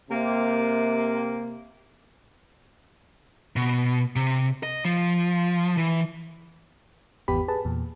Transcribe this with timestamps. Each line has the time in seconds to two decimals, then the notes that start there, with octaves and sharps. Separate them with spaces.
0.10 C3 A#3
3.56 B2
4.16 C3
4.63 D#5
4.85 F3
5.77 E3
7.28 G#1 E2 B3 G4 B5
7.48 G#4 B4 A5
7.65 E2 A#2